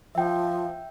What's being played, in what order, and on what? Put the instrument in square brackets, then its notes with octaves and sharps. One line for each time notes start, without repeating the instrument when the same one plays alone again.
[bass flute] F3 [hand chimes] E5 G5